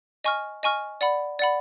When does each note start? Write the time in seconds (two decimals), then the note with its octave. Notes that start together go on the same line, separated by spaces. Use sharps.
0.24 D#5 G#5 C#6 F6
0.63 D#5 G#5 C#6 F6
1.01 D5 F#5 B5
1.39 D5 F#5 B5